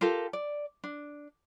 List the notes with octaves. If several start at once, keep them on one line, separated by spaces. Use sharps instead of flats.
F4 G4 A4 A#4
D5
D4